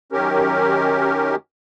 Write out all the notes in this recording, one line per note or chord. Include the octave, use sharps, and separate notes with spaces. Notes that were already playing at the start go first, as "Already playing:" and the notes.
F#2 D#3 C#4 G4 A#4